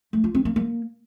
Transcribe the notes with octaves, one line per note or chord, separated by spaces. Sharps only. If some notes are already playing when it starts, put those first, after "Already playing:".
A3
F4
C4
A#3
A#3